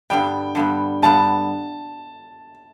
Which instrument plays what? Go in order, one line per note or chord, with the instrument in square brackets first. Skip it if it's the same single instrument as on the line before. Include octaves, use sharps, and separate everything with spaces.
[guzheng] G2 D3 G3 B3 [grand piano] G5
[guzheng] G2 D3 G3 B3
[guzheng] G2 D3 G3 B3 [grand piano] A5